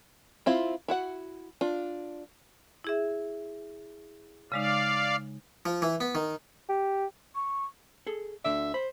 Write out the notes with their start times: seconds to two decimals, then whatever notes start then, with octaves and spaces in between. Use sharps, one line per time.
0.46 C4 E4 F4
0.88 E4 F#4 F#5
1.61 D4 F4
2.84 E4 G#4 E5
4.52 C#3 G#3 D#4 D5 F5
5.66 F3
5.82 E3
6.01 B3
6.15 D#3
6.69 G4
7.35 C#6
8.07 G#4 A4
8.45 D2 D3 D5 E5
8.74 C5 B5